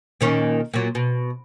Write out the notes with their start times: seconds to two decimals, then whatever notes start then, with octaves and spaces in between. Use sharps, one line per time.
0.21 A#2 D#3 C#4
0.74 A#2 F#3
0.95 B2